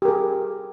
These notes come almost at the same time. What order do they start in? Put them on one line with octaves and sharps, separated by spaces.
G4 A#4 G#4